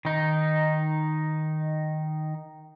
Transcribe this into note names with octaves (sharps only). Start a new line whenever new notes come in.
D#3 D#4